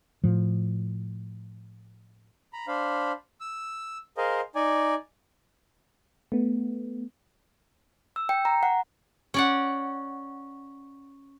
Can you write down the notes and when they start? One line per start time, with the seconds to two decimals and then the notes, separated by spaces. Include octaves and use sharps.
0.24 A2 F3
2.53 A#5 B5
2.68 D4 C5 F5 B5
3.41 E6
4.17 G#4 A#4 C5 D#5 F5
4.55 D#4 D5 G#5
6.32 A3 B3
8.16 E6
8.29 G5
8.45 A#5
8.63 F#5
9.34 C#4 D5 F#5